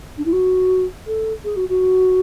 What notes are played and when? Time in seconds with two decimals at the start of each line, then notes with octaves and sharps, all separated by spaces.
0.18 D4
0.25 E4
0.32 F#4
1.07 A4
1.44 G#4
1.56 F#4
1.69 F#4